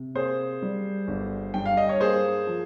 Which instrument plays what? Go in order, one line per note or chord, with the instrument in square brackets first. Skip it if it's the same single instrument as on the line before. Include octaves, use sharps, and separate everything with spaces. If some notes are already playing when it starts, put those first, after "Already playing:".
Already playing: [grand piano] C3
A#3 G#4 C5
G3
G1
G2 G5
F5
D#5
C#5
A#3 G#4 C5
F3